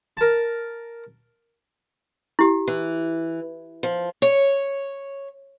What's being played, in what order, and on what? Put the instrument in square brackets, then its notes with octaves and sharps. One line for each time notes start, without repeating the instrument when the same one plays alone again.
[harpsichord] A#4 A5
[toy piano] E4 G4
[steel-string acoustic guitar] E3
F3
C#5